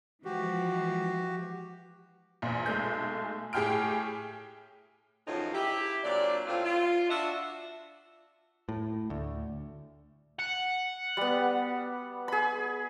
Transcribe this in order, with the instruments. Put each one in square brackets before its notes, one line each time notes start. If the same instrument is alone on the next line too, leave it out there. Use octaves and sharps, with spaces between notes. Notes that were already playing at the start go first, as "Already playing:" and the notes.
[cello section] E3 F3 G#3 [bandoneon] F#4 G4
[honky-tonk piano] A#1 E2 A#2
B1 G#3 A3 G6
A2 G4 G#4 G5 F6 D7
[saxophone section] F#2 A2 C#3 F3 D#4 F4
E4 G4
A#2 F#3 C4 D4 D5
A2 C4 F4
F4
D4 F#4 E5
[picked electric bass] A2
D2
[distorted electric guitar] F#5
[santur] G3 B3
G#4 B5